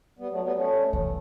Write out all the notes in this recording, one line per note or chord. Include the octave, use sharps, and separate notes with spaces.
G3 B3
F#3 A3
G3 B3
A3 C#4
E3